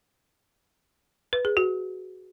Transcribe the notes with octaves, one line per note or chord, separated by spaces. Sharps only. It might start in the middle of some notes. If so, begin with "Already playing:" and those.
B4
G#4
F#4